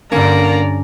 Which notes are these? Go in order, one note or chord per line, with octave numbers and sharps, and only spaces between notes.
G2 D3 A#3 C#4 D5 A#5